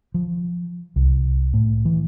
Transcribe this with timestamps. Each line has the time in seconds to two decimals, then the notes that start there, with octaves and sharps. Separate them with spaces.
0.14 F3
0.96 C2
1.54 A2
1.85 E3